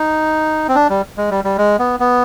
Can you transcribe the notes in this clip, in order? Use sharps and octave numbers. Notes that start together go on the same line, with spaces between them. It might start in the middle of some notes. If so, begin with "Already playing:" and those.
Already playing: D#4
C4
D4
G3
G#3
G3
G3
G#3
B3
B3